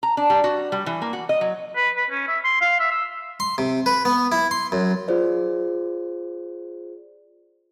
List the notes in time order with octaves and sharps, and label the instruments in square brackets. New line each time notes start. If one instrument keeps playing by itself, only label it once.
[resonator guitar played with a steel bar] A#5
D4
G3
F#4
G3
E3
A#3
F#4
D#5
F#3
[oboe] B4
B4
C#4
E5
C6
F5
E5
E6
[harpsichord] C6
C3
B4
B3
E4
C6
F#2
[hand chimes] F4 G#4 C5 D5